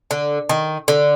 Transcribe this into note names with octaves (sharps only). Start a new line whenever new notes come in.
D3
D#3
D3